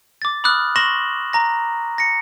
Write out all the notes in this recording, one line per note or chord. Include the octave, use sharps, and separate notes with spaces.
D6 A6
B5 D6 D#6 F6 F#6
C6 C#6 A#6 E7 F#7 G7
A#5 A#6
A#6 C#7